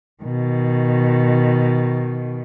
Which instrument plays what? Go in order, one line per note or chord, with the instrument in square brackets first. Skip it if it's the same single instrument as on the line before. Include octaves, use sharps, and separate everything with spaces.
[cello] B2 D#3